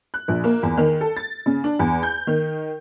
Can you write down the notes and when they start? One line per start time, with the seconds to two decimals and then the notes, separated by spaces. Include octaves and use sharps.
0.14 F#6
0.28 A#1
0.44 A#3
0.63 E2
0.77 D#3
1.01 A4
1.17 A6
1.46 C#3
1.64 D4
1.79 E2
2.03 G6
2.27 D#3